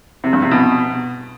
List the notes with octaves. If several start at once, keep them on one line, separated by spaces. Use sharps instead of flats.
C3
G2
C3
B2